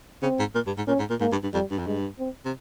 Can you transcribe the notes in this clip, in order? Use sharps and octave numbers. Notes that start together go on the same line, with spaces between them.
C#3 C4
G#2
A#2
G2
G#2
A#2 C#4
G#2
A#2
G#2 A#3
G2
G2
F2 G3
G2
F2
G2 G#3
C4
C3